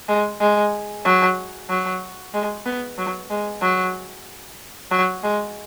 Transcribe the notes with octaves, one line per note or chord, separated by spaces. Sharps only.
G#3
G#3
F#3
F#3
G#3
B3
F#3
G#3
F#3
F#3
G#3